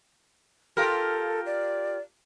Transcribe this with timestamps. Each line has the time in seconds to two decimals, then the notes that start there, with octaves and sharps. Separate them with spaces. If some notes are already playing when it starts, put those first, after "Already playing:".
0.77 F4 G4 A4 A#4
1.46 D5